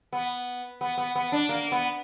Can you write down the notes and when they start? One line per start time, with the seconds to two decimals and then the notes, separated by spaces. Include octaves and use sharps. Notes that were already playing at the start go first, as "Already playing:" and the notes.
0.13 B3
0.81 B3
0.97 B3
1.15 B3
1.32 D4
1.49 A#3
1.72 B3